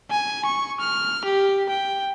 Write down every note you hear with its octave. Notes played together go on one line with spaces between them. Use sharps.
G#5
C#6
F6
G4
G5